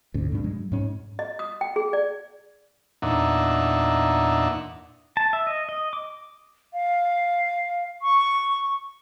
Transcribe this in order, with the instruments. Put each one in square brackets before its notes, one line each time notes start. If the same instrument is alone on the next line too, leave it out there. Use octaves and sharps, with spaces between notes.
[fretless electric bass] D2 G#2 C#4
G2 B2 D4
F#3 G#3
G#2 C#4
[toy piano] D#5
D#6
G5
G#4
D5
[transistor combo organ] E2 A#2 D4 D#4 E5 F#5
[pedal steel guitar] A5
E5
D#5
D#5
D6
[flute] F5
C#6